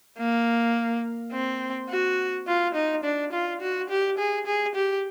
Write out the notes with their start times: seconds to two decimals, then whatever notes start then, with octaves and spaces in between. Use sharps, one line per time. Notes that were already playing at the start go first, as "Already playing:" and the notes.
0.18 A#3
1.32 C4
1.89 F#4
2.47 F4
2.75 D#4
3.04 D4
3.32 F4
3.61 F#4
3.90 G4
4.18 G#4
4.46 G#4
4.75 G4